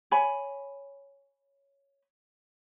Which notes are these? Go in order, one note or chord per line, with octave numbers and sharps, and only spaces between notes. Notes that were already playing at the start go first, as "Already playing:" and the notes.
C#5 G#5 B5